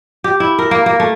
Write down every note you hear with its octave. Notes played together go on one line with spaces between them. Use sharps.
G4
E4
A#4
A#3
A#3
A3